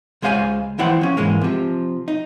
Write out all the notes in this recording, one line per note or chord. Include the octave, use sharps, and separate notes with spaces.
C#2 G#3 C5 F5 G5 G#5
E3 F3 E4 C5 F#5 G5
F3 C#4
G#2 E3 G#3 A#3
C3 F3
D#4